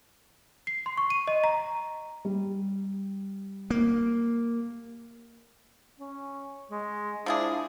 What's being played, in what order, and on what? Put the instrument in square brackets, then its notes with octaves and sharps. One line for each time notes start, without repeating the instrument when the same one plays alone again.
[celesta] C7
C6
C#6
D#7
D#5
A#5
[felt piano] G3
[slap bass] A#3
[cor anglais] C#4
G#3
[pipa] F3 E4 G#4 [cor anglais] D4